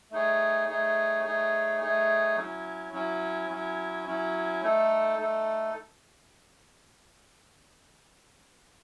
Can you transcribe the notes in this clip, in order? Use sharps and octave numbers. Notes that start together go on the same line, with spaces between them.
A3 D#4 G#4 C#5
A3 D#4 G#4 C#5
A3 D#4 G#4 C#5
A3 D#4 G#4 C#5
F#3 C#4 E4
F#3 C#4 E4
F#3 C#4 E4
F#3 C#4 E4
A3 D#4 A4
A3 D#4 A4